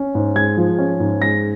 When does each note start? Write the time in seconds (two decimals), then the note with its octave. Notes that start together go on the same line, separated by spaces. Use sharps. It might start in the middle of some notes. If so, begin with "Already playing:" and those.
Already playing: C#4
0.15 G#2
0.36 G#3 G#6
0.57 F3
0.79 C#4
1.00 G#2
1.22 G#3 A#6